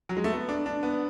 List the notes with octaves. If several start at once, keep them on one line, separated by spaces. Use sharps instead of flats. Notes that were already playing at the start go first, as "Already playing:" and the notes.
F#3
G#3
A3
B3
D4
D4
B3